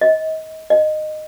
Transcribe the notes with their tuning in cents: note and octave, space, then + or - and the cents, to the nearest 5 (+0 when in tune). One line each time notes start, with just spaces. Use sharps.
D#5 +30
D#5 -15